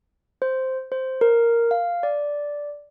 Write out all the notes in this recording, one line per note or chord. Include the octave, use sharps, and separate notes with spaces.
C5
C5
A#4
F5
D5